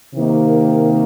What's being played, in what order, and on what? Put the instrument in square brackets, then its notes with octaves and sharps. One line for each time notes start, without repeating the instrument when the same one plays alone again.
[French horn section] C3 D#3 A#3